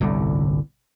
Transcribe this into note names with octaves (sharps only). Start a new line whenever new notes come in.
G1 C2 A2 D3